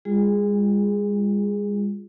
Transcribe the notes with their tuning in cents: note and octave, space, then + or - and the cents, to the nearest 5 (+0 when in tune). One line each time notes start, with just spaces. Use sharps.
G#3 -45 F4 +0 G#4 -10